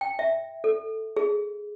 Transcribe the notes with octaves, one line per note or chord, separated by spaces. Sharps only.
G5
E5
A4
G#4